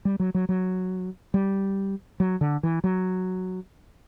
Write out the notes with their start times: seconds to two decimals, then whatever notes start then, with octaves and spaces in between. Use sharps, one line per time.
0.05 G3
0.20 F#3
0.34 F#3
0.49 F#3
1.34 G3
2.20 F#3
2.41 D3
2.63 E3
2.84 F#3